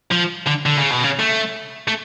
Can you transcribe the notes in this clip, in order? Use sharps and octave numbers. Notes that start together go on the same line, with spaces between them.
F3
D3
D3
C#3
B2
C#3
A3
A3